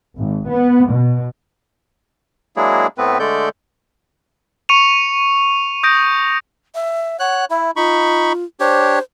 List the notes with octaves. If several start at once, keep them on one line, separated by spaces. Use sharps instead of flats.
G#1
B3
B2
F#3 G#3 A#3 D4 E4 G#4
A2 A3 B3 C4 B4
D3 G#3 A3 A4 D5 G6
C#6 C#7 D#7 F7
D#6 G6 A#6 D7
E5
C#5 F#5 F#6
E4 E5
D#4 F4 B5 C#6
D4 G4 C5 C#5